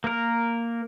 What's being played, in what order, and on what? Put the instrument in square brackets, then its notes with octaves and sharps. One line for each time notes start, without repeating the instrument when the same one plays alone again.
[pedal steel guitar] A#3 A#4